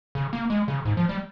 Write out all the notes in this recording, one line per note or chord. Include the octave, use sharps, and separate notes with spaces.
C#3
A#3
G#3
C#3
G#2
F3
G3